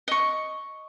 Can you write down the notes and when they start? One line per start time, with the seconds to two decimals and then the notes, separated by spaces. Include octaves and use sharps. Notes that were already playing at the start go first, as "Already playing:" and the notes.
0.08 D#5 C#6